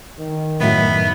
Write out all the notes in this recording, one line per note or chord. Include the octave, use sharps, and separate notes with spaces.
D#3
F#2 A2 F#3 B3 E5